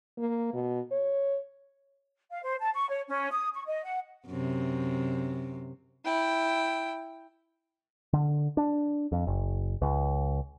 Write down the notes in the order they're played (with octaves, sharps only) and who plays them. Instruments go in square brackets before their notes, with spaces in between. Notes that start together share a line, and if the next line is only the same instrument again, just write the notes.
[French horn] A#3
B2
C#5
[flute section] F5
C5
A5
C#6
C#5
C#4
D#6
C#6
D#5
F#5
[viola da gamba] F#2 C3
[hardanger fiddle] E4 G5
[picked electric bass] D3
D4
F2
F#1
C#2